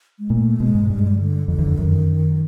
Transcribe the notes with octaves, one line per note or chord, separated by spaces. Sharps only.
G#3
A#2 A3
B2 G#3
G#2
G2 G3
G#3
G3
D3
F2 D3
E2
F2
F#2 D#3